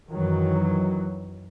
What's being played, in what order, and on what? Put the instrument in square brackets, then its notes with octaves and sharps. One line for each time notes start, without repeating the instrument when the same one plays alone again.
[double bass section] F#2 D#3 E3 F#3